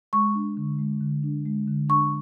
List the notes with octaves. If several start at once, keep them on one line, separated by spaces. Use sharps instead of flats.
G#3 C#6
D4
D3
G#3
D3
D4
G#3
D3
D4 C#6